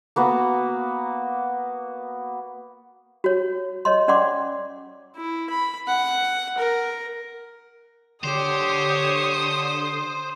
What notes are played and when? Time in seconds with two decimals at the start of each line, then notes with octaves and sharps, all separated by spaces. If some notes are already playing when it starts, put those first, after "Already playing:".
0.16 A#3 B3 F#4
3.24 F#4 C#5
3.85 C#5 D#5 C6
4.08 C#4 D5 F#5 C6 D6
5.16 E4
5.50 B5
5.88 F#5
6.58 A#4
8.24 D3 G4 C5 C#5 D#6